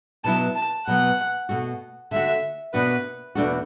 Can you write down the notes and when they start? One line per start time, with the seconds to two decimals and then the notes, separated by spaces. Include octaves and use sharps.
0.24 B2 F#3 B3 E4 A5
0.56 A5
0.86 B2 F#3 B3 F#5
1.49 B2 A3 F#4
2.11 D3 A3 F#4 E5
2.74 B2 B3 D4 F#4 B4
3.35 E2 B2 A3 D4 F#4